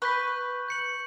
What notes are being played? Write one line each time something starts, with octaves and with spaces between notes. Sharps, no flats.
B4 C#6 G6 B6
G6 C#7 F#7